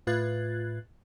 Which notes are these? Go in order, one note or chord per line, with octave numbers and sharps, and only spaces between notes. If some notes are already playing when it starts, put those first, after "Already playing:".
A2 F4 B4 F#6 G#6 A6